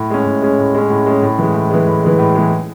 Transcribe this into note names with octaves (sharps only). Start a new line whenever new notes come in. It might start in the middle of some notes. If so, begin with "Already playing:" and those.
Already playing: A2
G#3 C#4
A2
G#3 C#4
A2
G#3 C#4
A2
G#3 C#4
A2
E3 G#3
A2
E3 G#3
A2
E3 G#3
A2
E3 G#3